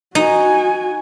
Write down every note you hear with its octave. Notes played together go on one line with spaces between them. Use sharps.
D#4 F#4 G#5